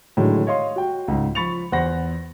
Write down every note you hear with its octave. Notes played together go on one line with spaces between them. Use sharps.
A2 D3 D#3 F#3 G#3
C#5 D#5 F5 C6
F#4 G5
C#2 G#2
F3 B5 C#6 A6 C#7 F7
E2 C5 F#5 B5 A#6